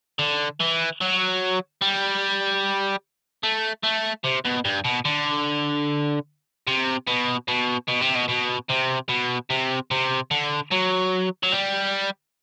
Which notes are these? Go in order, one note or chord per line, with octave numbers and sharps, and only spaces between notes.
D3
E3
F#3
G3
A3
A3
C3
B2
G2
B2
D3
C3
B2
B2
B2
C3
B2
B2
C3
B2
C3
C3
D3
F#3
F#3
G3